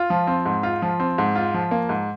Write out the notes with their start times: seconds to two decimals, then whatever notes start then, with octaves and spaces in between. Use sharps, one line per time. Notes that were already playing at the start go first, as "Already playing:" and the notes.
Already playing: F4
0.10 F3
0.27 C4
0.46 G#2
0.63 F4
0.82 F3
1.00 C4
1.18 G#2
1.35 F4
1.54 F3
1.71 A#3
1.89 G#2